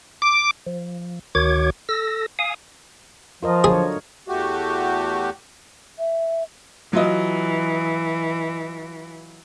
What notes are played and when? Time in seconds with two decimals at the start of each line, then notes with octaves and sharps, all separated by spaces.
0.22 D6
0.66 F3
1.35 D2 D#3 F#4 C#5 D6 G#6
1.89 A4 E6 A#6
2.39 F5 G#5 D#6
3.43 F3 F4 A#4 D#5
3.64 D3 F#3 G#4 C#5
4.28 E2 A3 F#4 G4
5.99 E5
6.93 E3 F#3 F4 D#5